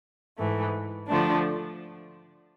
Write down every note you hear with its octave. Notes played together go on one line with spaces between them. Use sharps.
G#2 E3 A3
D3 F3 A3 D4